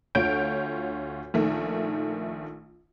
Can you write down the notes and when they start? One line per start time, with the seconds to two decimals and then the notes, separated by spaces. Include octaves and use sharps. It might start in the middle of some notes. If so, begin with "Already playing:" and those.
0.15 D2 D3 F4 C#5 G6 D7
1.34 A#1 D#3 A3